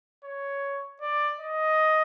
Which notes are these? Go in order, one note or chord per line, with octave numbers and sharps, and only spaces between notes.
C#5
D5
D#5